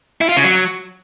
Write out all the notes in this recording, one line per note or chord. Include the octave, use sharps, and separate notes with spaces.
E4
F4
C#3
F#3